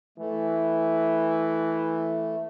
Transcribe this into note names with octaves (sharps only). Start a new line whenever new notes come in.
E3 A3